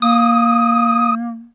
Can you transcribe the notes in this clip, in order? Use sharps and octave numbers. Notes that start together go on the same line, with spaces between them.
A#3 D#6